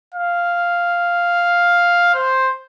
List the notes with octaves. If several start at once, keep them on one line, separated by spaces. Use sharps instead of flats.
F5
C5